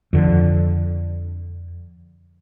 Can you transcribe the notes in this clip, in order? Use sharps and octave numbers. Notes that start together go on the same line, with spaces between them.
F2 D3